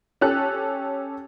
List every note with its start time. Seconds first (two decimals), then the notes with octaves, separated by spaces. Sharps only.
0.21 C#4 G4 A4 F#6